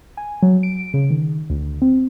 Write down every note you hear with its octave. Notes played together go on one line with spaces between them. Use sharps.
G#5
F#3
D7
C#3
D#3
D2
C4